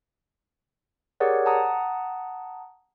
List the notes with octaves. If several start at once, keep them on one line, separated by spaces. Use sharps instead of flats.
G4 G#4 A#4 C#5 D5 F#5
F#5 A5 A#5 D#6